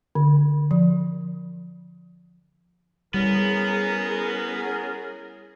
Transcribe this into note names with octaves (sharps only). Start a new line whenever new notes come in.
D3
F3
G3 B3 C#4 E4 G#4 A#4